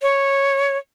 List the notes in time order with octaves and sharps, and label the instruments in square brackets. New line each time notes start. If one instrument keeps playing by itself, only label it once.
[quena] C#5